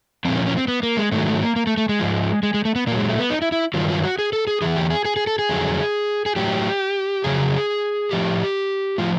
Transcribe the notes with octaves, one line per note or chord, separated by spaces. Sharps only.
A#2 F3 C4
C#4
C#4
C4
B3
A#3
G#3
G#2 D#3 F#3 A3
A3
A#3
A#3
A3
A3
G#3
G#2 F3
G#3
G#3
A3
B3
A#2 F#3 A#3
G#3
A3
B3
D#4
E4
E4
G2 D#3 F#3 F4
F4
F#4
G#4
A4
G#4
E2 C#3 E3 G#4
G4
G#4
G#4
G#4
A4
G#4
F2 D3 F#3
G#4
A2 F#3 G4
F2 C#3 F#3 G#4
A2 F3 G4
A2 F3 F4